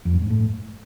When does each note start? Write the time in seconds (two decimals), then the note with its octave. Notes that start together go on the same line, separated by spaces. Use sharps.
0.05 F2
0.14 G2
0.22 G#2
0.30 A2